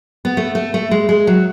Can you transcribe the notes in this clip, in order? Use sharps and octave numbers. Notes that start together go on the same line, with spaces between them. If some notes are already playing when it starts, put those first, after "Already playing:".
B3
A3
A3
A3
G#3
G#3
F#3